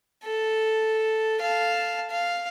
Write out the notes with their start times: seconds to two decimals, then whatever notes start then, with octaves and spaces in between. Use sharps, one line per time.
0.24 A4
1.41 F5 A5
2.10 F5